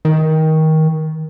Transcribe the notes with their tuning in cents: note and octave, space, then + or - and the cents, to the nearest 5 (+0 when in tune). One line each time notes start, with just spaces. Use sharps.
D#3 +20